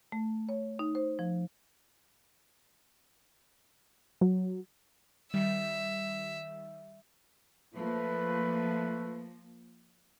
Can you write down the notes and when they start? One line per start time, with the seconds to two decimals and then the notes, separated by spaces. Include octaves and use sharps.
0.12 A3
0.49 C#5
0.79 D#4
0.95 C5
1.19 F3
4.21 F#3
5.34 D#3 G3 E5
7.75 F3 A3 A#3 B4